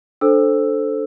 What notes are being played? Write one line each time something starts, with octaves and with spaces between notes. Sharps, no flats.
D4 A4 C5 E6